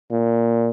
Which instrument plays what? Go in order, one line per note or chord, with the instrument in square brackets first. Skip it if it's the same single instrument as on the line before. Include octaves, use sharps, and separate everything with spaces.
[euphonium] A#2